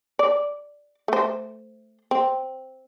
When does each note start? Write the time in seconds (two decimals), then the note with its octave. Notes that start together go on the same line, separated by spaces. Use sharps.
0.19 D5
1.08 A3 C5
2.11 C4